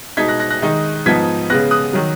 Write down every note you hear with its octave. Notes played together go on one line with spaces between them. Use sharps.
B2 G#3 D#4 G#6 B6
F#6 A#6
F#6 A#6
F#6 A#6
D#3 G#3 D#4
G#2 F3 B3 D#4 G#6 B6
C#3 G#3 B3 F#6 A#6
D#6 F#6
D#3 F#3